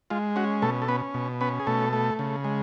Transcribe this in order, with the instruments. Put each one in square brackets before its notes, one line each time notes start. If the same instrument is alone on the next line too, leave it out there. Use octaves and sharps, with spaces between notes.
[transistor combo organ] G#3 F4
C#4 F#4
B2 A3 A4
A4
B3 C#4 B4
B2
B3 C#4 B4
G#4
B2 A3 A4
A3
C#3
G#3